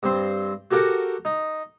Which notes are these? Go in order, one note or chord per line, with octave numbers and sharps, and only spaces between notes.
G2 C4 C6
F#4 G4 A4 A#4 F#5 G5
D#4